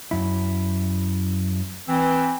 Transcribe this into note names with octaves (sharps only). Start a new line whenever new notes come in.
F#2 E4
E3 C4